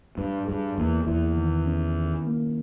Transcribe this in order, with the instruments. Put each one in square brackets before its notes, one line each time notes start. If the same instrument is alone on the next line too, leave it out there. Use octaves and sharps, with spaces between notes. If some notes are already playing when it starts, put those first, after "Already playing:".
[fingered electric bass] G2 [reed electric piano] B4
[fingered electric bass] G2 [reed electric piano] G#4
[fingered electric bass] E2 [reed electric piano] A#3
[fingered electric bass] E2 [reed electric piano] E4
[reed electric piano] D#3
C#4
D#3
A#3